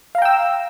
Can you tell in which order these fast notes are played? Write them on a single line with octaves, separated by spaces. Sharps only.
F5 A#5 G5 E6